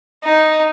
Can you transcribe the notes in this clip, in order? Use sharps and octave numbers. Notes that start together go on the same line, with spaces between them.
D#4